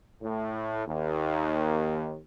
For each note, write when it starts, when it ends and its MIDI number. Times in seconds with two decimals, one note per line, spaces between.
0.22 0.84 45
0.86 2.19 39